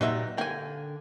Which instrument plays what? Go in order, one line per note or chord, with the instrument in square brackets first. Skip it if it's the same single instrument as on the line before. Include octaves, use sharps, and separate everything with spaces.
[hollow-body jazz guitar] A#2 F#3 G3 [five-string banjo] D#4 B4 E5
[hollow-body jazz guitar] D3 G5 [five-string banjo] A#3 G#5